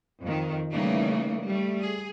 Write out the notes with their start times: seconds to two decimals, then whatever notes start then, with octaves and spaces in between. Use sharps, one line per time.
0.21 F2 D#3
0.70 C#3 E3 G3 A3 A#3 D#4
1.46 G3 A3
1.81 G#4